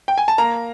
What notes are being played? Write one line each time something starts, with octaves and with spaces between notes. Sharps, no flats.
G5
G#5
A5
A#3 A#5